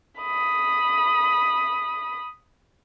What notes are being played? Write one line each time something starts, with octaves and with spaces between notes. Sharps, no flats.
B5 D#6